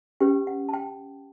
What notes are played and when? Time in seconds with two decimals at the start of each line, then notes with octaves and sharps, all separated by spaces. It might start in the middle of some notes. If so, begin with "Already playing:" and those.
0.20 C#4 G4 B4 G5
0.47 F#5
0.69 A5
0.74 G5